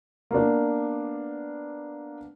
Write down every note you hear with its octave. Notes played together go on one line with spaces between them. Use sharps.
A#3 B3 D4